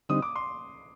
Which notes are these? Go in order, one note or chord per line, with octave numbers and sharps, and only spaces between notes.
D3 G3 C4 D#4 D#6
D6
C6